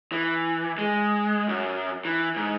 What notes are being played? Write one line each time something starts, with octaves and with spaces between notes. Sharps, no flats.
E3
G#3
F#2
E3
G#2